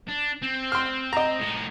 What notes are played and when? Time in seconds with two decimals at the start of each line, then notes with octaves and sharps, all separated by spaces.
0.09 D4
0.43 C4
0.72 C6 F6
1.13 D#5 A#5
1.40 A2 D#4